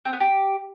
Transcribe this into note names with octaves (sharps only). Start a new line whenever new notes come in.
C4
B3
G4